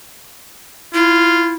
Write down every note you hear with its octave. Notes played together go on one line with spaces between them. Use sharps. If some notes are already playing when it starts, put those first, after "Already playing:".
E4 F4